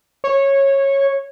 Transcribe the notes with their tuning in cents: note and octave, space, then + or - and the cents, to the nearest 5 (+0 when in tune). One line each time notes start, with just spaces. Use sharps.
C#5 -15